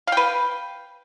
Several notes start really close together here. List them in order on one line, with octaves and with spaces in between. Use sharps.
F5 G5 B4